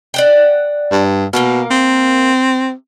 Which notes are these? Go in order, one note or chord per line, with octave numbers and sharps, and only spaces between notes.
D5 F#5 G5
G2
B2 A#3 A#4 F5
C4